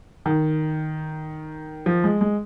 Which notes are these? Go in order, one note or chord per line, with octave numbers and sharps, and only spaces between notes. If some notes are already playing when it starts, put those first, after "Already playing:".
D#3
F3
G#3
G#3